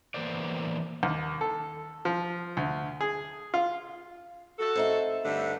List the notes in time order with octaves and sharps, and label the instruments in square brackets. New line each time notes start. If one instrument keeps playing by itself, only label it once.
[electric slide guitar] E3 A#3 B3 C5 D5
[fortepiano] D#2
A4
F3
D2
G#4
F4
[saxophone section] F#4 A4
[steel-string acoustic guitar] C4 D#4 E5
[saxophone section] G2 D3 A3